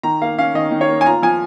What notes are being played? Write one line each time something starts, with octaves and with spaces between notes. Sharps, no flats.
D#3 A#5
A#3 F5
C#4 F5
D#3 D#5
D#3
C#5
A#3
G#5
F4 A#5
F3 G#5